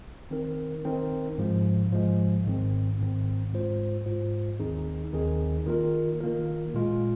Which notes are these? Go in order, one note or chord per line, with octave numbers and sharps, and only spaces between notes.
D#3 C4 D#4 A#4
D#3 C4 D#4 A#4
G#2 F3 G#3
G#2 F3 G#3
G#1 G#2 D#3 C4
G#1 G#2 D#3 C4
G#2 G#3 F4 C5
G#2 G#3 F4 C5
D#2 D#3 C4 D#4 G#4
D#2 D#3 C4 D#4 G#4
D#3 A#3 F4 A#4
D#3 A#3 F4 A#4
A#2 G#3 F4